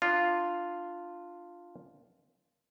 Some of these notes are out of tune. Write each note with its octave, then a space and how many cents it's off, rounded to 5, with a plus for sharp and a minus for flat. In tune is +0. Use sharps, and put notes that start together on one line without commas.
D4 +20 F4 +0